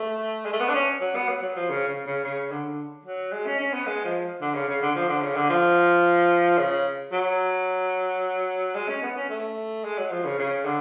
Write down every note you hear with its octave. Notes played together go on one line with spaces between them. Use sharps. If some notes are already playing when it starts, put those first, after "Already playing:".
Already playing: A3
G#3
A3
B3
D4
C#4
F#3
B3
F#3
F#3
F3
C#3
C#3
C#3
C#3
D3
F#3
G#3
C#4
C#4
B3
G#3
F3
D3
C#3
C#3
D3
F3
D3
C#3
D3
F3
C#3
F#3
G#3
C#4
B3
C#4
A3
G#3
F#3
F3
C#3
C#3
D3